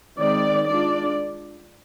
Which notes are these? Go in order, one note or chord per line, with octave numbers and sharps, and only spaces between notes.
D#3 G#3 C4 D5
G#3 D4 F4 D5